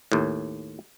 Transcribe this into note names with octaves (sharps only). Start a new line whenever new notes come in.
D#2 A2